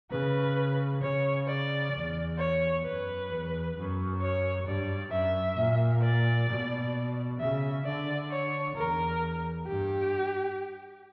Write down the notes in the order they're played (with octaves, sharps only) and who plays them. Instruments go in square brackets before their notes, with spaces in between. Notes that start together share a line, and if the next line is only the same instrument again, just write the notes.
[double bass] C#3 [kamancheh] B4
[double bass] C#3 [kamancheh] C#5
[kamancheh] D5
[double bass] E2
[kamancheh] C#5
[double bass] F#2 [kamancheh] B4
[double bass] E2
F#2
[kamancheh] C#5
[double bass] G2 [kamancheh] D5
[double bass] F#2 [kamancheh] E5
[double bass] A#2
[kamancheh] D5
[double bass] B2
[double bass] C#3 [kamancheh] E5
[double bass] D3 [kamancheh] D5
[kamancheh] C#5
[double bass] E2 [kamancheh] A#4
[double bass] G2 [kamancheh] G4